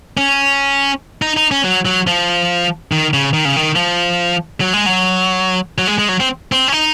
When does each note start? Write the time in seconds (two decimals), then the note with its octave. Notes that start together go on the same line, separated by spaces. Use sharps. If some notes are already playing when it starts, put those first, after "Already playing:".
0.17 C#4
1.22 D#4
1.37 D#4
1.51 C#4
1.64 F#3
1.85 F#3
2.07 F3
2.92 D#3
3.13 C#3
3.33 D#3
3.45 C#3
3.56 D#3
3.76 F3
4.61 F#3
4.73 G#3
4.86 F#3
5.78 F#3
5.87 G#3
5.99 G#3
6.09 F#3
6.20 C4
6.52 C4
6.68 C#4
6.72 D#4